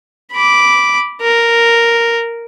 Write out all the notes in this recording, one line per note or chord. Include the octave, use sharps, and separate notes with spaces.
B5 D6
A#4